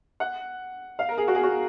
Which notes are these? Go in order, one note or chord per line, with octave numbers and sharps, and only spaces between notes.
F#5
F5
A#4
G#4
F#4
G#4
F#4